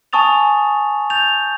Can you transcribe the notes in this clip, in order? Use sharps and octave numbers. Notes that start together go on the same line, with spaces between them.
G#5 A5 C#6 D#6 A6 F7
G6 A6 F7